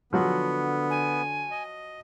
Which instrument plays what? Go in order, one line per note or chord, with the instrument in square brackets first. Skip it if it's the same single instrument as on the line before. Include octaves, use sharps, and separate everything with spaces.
[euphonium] D3 [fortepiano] F3 F#3 F#4 [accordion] B3
[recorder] G#5
[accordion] D#5